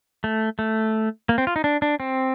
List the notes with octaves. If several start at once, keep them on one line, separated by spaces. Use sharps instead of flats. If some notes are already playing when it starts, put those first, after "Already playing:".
A3
A3
A#3
C4
F4
D#4
D4
D4
C4